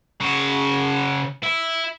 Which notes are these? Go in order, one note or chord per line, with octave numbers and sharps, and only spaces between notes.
C#3 F#4
E4